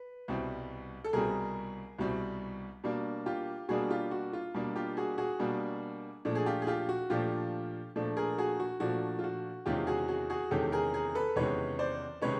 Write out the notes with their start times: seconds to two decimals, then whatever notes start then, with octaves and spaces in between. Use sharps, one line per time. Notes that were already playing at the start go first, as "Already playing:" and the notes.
Already playing: B4
0.28 C2 B2 G3 C4
1.04 A4
1.13 C2 B2 G3 C4 G#4 A#4
1.98 C2 B2 G3 C4
2.84 B2 G3 A#3 D4
3.26 F4 G4
3.69 B2 G3 A#3 D4 F#4 G#4
3.90 F4 G4
4.11 F#4
4.33 F4
4.54 B2 G3 A#3 D4
4.76 F4 G4
4.97 F#4 G#4
5.18 F#4 G#4
5.39 B2 G3 A#3 D4
6.25 A#2 F3 A3 D4
6.35 G#4
6.46 F4 G4
6.62 G#4
6.67 F4 G4
6.89 F#4
7.10 A#2 F3 A3 D4 F4 G4
7.96 A#2 F3 A3 D4
8.17 G#4 A#4
8.38 F#4 G#4
8.60 F#4
8.80 A#2 F3 A3 D4 F#4
9.19 F4
9.24 F#4
9.66 E2 C3 D#3 G#3 C#4 F4 G4
9.87 F#4 G#4
10.08 F#4 G#4
10.30 F#4 G#4
10.51 E2 C3 D#3 G#3 C#4 G4 A4
10.72 G#4 A#4
10.94 G#4 A#4
11.15 A4 B4
11.36 E2 C3 D#3 G#3 C#4 B4 C#5
11.79 C5 D5
12.22 C3 D#3 G#3 C#4 B4 C#5